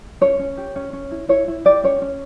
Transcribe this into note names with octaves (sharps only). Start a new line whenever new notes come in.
C#4 C#5
C#4
G4
C#4
C#4
E4
E4 C#5
E4
G4 D5
C#4 C#5
C#4